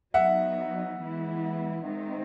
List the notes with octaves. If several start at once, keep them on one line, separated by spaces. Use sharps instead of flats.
F#3 B3 D#4 E5 F#5
E3 G#3 B3 E4
D#3 G#3 C4 D#4